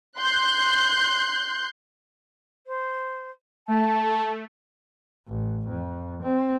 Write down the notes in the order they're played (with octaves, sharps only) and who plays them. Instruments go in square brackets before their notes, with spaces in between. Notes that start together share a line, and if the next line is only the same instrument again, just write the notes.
[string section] C6 F#6 G6
[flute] C5
[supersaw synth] A3 [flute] A5
[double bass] A1
F2
C4